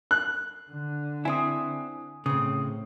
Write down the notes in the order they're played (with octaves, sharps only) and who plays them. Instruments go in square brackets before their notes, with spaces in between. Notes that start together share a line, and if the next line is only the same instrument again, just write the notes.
[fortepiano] F#6
[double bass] D3
[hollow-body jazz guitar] C4 E4 [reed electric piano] G#5 D#6
[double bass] A2 [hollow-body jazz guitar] C#3 C4 [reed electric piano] D#6